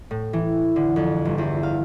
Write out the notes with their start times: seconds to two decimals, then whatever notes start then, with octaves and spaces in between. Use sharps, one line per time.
0.11 A2
0.33 E3
0.76 D3
0.96 F2
1.25 G1
1.38 E2
1.63 F5